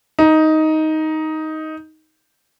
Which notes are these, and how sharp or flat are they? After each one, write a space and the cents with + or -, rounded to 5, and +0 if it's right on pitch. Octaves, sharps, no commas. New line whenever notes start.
D#4 +10